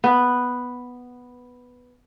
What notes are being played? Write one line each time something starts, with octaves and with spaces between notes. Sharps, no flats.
B3 B4